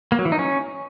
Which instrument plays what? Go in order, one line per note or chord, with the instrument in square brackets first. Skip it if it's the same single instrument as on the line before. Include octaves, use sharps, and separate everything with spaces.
[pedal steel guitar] A#3
F#3
E3
D#4
C#4